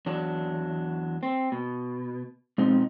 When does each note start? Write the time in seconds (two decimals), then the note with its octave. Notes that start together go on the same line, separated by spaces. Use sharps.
0.06 E2 F#3 D4
1.23 C4
1.52 B2
2.58 B2 F3 G#3 C4 D#4